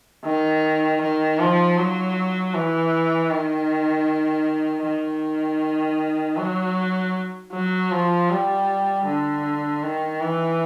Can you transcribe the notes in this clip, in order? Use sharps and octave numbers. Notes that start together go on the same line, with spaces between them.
D#3
D#3
F3
F#3
E3
D#3
D#3
F#3
F#3
F3
G3
D3
D#3
E3